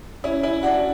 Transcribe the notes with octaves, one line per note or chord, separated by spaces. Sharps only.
C#4 E4
C#4 E4
D4 F#4